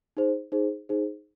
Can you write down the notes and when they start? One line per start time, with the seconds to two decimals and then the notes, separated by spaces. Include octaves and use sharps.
0.17 D#4 G#4 C5
0.52 D#4 G#4 C5
0.89 D#4 G#4 C5